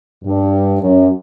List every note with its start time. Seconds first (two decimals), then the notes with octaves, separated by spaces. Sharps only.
0.24 G2
0.81 F#2